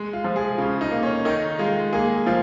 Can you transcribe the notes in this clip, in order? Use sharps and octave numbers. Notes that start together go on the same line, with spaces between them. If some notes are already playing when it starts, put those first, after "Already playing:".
Already playing: G#3
F4
F3
G#4
C#3 F4
D#4
A#3
C#4
D#3 D#4
G#3 F4
A#3 G#4
F3 F4